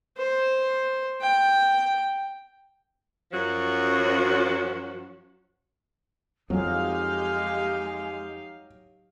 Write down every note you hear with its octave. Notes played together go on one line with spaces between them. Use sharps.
C5
G5
F#2 F3 C#4 F#4
F2 F#3 G#3 D#4 G4 F5